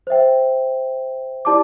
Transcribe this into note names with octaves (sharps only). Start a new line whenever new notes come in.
C5 E5 G5
E4 G4 D5 A5 D6